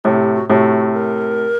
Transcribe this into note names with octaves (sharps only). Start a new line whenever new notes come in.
A2 C3 G4
G4
F#4
A2 C3 F#4
A#4